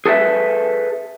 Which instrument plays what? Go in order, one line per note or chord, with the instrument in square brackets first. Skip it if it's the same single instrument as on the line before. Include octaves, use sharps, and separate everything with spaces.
[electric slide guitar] G#4 A4 B4 E5